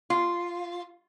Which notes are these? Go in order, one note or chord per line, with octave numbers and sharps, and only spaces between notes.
F4